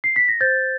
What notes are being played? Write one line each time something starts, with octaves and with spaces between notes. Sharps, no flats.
C7
B6
A#6
C5 G6 A6
C5